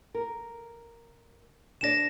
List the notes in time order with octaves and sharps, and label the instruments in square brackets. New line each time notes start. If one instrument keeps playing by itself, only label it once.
[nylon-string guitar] A#4
[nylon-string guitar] D2 D4 D5 [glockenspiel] A#6 E7